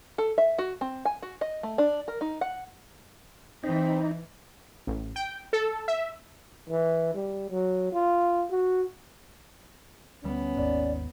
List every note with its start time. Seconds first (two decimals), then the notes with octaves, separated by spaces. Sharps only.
0.18 A4
0.38 E5
0.58 F#4
0.81 C4
1.05 G#5
1.22 F#4
1.41 D#5
1.63 A3
1.78 D4
2.08 A#4
2.21 D#4
2.41 F#5
3.64 E3 C4 D#4
4.87 A1
5.16 G5
5.53 A4
5.88 E5
6.69 E3
7.15 G3
7.50 F#3
7.93 F4
8.51 F#4
10.24 D2 G3 B3 C#4
10.57 G#1 D#2 G#2 D5